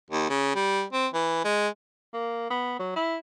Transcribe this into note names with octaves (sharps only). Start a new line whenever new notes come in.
D#2
C#3
G3
C4
E3
G#3
A#3
B3
F#3
E4